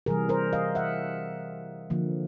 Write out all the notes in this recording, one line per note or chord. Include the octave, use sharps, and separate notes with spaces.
C3 E3 G3 G#4 A#4
A#4 C5
D#5 F5
E5 F#5
D3 F3 A#3